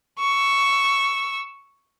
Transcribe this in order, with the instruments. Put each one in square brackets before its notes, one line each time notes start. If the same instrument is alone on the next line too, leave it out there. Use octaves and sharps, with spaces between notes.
[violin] C#6 E6